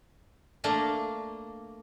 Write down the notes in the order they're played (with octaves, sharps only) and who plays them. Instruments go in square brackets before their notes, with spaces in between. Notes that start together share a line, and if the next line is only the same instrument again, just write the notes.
[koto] A3 A#3 D4 F5 A#5